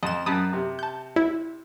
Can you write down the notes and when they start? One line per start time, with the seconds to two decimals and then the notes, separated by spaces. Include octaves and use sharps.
0.03 F2 D#5 E7
0.26 F#2 A5 B5 D#6
0.53 C3
0.79 A5 G6
1.16 E4